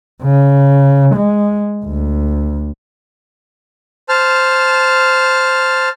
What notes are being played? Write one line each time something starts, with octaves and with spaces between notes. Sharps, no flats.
C#3
G#3
D2
C5 A5 F6